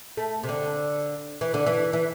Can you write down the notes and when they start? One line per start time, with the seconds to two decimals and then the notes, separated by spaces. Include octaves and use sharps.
0.17 A3
0.43 C3
0.49 D3
1.41 E3
1.54 D3
1.66 E3
1.93 E3